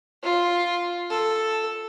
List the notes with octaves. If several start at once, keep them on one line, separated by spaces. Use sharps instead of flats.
F4
A4